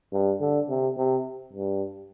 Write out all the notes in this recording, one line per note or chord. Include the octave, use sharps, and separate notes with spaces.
G2
D3
C3
C3
G2